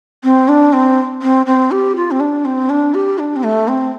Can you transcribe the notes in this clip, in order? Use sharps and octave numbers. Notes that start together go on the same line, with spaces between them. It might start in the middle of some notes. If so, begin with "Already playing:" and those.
C4
D4
C4
C4
C4
G4
F4
C4
D4
C4
D4
G4
D4
C4
A3
C4